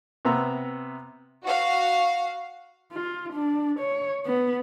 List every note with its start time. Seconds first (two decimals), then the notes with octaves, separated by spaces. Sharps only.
0.25 C3 B3 E5 A#5
1.44 F#4 F5
2.92 F4
3.33 D4
3.80 C#5
4.26 B3